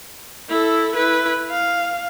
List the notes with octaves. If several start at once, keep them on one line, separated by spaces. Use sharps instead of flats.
E4 A4
E4 B4
F5